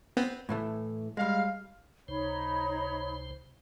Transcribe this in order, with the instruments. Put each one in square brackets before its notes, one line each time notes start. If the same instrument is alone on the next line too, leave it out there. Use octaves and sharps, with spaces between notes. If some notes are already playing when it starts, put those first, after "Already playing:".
[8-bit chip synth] B3 C4
[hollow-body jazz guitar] A2 E3 A3
[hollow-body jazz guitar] G3 G#3 [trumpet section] F5
[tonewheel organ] C#2 C3 C5 [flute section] D#4 C#5 B5